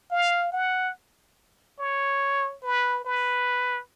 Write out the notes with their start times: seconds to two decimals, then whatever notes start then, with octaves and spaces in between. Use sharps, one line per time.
0.11 F5
0.52 F#5
1.79 C#5
2.63 B4
3.05 B4